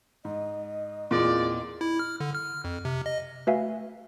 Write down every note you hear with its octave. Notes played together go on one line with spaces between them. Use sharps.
G#2 D#5
E2 A#2 C4 F4 G#4 D5
E4
F6
D3
F6
F2
C3
D#5
A3 F#4 B4 E5 F5 G#5